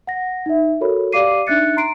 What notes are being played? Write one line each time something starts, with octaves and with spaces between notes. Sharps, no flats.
F#5 A#6
D#4 E5
F#4 A4 A#4 C#5 B5
G4 D5 F5 D6 C7 D#7
D4 D#4 E5 F#6 A6 C#7
A#5 C6 C7 D7